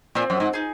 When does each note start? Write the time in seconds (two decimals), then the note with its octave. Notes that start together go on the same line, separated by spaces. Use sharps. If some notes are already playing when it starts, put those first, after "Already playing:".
0.15 A#2 C4
0.30 F#2
0.40 G#2
0.53 D#4 G#4